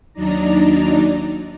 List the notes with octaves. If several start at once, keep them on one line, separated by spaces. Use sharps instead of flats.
D#2 F#3 D4 D#4 D5 A#5